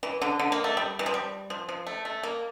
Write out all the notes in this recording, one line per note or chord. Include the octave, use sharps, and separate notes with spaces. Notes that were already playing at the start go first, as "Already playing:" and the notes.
E3
D3
D3
A#3
A3
G3
E3
F3
G3
F3
F3
A3
A3
A#3